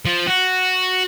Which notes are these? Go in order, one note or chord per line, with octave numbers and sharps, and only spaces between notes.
F3
F#4